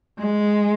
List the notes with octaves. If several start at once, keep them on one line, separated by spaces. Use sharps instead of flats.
G#3